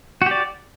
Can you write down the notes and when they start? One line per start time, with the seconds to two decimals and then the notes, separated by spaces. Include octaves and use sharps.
0.22 F#4
0.26 G4
0.31 D5